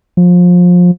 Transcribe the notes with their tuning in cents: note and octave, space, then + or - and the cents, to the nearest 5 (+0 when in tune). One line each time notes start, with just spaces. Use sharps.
F3 +25